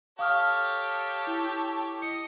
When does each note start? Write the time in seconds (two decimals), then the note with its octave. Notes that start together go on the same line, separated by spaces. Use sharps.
0.19 G4 A4 C#5 F5 D#6 F6
1.27 E4
2.02 D#5 C#7